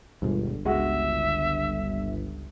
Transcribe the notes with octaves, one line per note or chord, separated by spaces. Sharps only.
G1 D#2 B2 G#3
C#2 G#3 F#4 E5